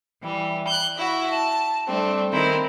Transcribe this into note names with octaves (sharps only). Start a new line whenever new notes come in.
E3 G3
F#6 G6
E4 F#4 E5
A5
G3 A3 C4 D4
D#3 C4 E4 A#4